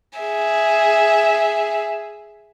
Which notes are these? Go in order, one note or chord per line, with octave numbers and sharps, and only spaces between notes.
G#4 E5